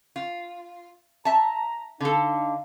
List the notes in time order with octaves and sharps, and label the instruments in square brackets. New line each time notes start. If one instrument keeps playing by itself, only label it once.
[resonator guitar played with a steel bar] F4
[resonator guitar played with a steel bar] E5 A5 [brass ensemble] A#5
[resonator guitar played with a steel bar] D3 A4 [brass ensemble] D#4 F5